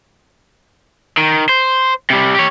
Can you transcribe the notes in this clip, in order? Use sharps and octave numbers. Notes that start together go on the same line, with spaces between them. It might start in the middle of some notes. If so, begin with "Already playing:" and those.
D#3
C5
C3 G3
G4 C#5